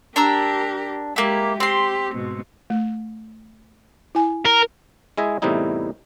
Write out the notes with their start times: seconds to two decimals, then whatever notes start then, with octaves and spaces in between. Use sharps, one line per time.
0.16 D4 G4 A#4 A#5 E6
1.16 G#3 A#3 E4 G4
1.60 C4 G4 C6
2.12 G#2 B2
2.70 A3
4.15 E4 G#5
4.45 A#4
5.18 G#3 E4 G#4 D#5 E5 G#5
5.42 E2 A2 C3 G3 D#4 E4